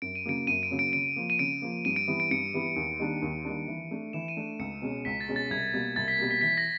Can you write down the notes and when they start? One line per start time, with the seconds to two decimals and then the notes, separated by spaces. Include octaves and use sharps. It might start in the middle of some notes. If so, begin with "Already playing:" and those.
0.02 F#2 D7
0.15 D#7
0.25 C#3 F#3 A#3 D7
0.47 F#2 D#7
0.63 D7
0.71 C#3 F#3 A#3
0.79 D7
0.93 C#3 D7
1.16 F3 A#3
1.30 D#7
1.39 C#3 D7
1.62 F3 A#3
1.85 G2 D#7
1.96 D7
2.08 E3 G3 B3 E4
2.20 D7
2.31 G2 C#7
2.54 E3 G3 B3 E4
2.76 D#2
2.99 D#3 G3 A#3 D4
3.22 D#2
3.45 D#3 G3 A#3 D4
3.68 E3
3.91 A3 D4
4.13 E3 E7
4.28 D#7
4.37 A3 D4
4.59 C#2 C#7
4.82 B2 G#3 C#4
5.05 C#2 B6
5.21 A6
5.28 B2 G#3 C#4
5.36 A6
5.50 C2 G#6
5.73 B2 G3 A#3
5.96 C2 A6
6.08 B6
6.19 B2 G3 A#3
6.31 B6
6.41 E3 B6
6.58 A#6